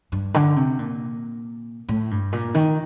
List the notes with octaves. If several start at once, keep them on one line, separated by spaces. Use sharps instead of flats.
G2
D3
C3
A#2
A2
G2
A#2
D#3